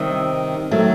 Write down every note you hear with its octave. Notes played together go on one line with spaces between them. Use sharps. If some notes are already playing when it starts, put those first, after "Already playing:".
Already playing: C3 D#3 G3
D#3 F#3 A3